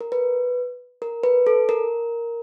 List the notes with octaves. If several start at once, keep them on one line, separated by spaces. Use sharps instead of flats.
A#4
B4
A#4
B4
A4
A#4